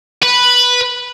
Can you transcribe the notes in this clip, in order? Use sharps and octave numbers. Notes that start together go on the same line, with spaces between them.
B4